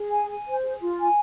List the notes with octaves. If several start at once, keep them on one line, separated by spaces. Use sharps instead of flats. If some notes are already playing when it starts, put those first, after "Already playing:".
Already playing: G#4
G#5
G#5
C5
G#4
F4
G#5